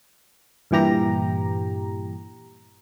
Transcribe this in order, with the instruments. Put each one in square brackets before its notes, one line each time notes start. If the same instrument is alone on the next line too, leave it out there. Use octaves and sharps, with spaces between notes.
[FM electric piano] G2 A#2 E3 G4 A#5